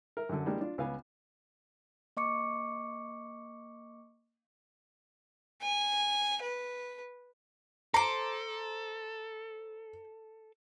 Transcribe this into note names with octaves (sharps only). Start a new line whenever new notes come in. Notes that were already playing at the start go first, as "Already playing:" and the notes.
A#4 E5
F#2 D3
E3 G3 G#3 A#3 D4
D4 F4
C#2 B3 F5 G#5
A#3 D#5 C#6 D6 C#7
G#5
B4
A4 C5 A#5 D6